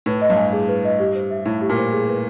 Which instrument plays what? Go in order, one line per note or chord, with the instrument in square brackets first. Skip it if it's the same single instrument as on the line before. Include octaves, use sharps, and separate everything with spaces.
[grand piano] A2 [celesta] B4
[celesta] D#5
[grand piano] G2
[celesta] G#5
G#4
B4
D#5
G4
C5
E5
[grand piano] A2 [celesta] E4
[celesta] G4
[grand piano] A#2
[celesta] C5
G#4
B4